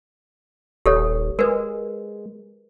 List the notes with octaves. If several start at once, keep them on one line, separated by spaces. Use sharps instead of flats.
D#1 G4 A4 C#5
G#3 A#4 B4